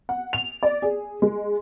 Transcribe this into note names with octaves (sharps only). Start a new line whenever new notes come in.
F#5
F7
D5
G#4
G#3